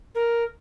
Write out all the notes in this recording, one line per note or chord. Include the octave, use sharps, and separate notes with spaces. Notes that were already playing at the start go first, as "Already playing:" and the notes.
A#4